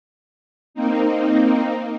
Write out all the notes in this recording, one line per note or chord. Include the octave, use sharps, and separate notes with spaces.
A#3 C4 D#4